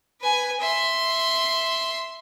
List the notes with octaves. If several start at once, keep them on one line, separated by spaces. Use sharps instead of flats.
B4 G#5
E5 C6